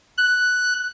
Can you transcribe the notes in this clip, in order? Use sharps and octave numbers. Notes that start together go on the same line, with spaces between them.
F#6